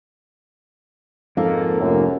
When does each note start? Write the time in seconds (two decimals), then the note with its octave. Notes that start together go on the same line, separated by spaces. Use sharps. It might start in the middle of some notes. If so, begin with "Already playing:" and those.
1.37 F2 G#2 A#3 A4
1.81 F1 F#2